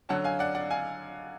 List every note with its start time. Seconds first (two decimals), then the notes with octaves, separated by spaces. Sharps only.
0.09 D3 F#3 C#4 F#5 A5
0.24 F5 G#5
0.39 D5 F#5
0.55 D5 F#5
0.71 F5 G#5